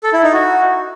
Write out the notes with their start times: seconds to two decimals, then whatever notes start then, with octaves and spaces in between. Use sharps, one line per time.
0.03 A4
0.13 E4
0.23 D#4
0.33 F#4